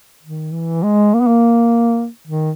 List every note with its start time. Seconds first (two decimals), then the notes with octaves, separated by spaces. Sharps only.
0.22 D#3
0.52 E3
0.83 G#3
1.14 A#3
1.21 B3
1.27 A#3
2.27 D#3